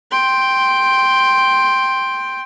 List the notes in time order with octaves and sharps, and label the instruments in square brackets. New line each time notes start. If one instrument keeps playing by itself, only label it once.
[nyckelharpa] G5 C6